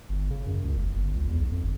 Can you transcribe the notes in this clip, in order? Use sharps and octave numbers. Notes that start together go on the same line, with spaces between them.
G1
C#3
F#2
C#2
F#1
G1
C#2
E2
B1
F2
G1